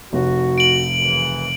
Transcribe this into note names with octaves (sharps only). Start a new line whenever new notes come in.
F1 F#4 C#5
D7 F#7
F#2 C#3 E3